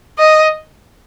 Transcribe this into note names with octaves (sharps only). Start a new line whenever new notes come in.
D#5